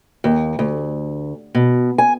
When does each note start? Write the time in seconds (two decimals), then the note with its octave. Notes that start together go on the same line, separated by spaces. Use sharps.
0.24 D#2
0.59 D2
1.55 B2
1.98 G#5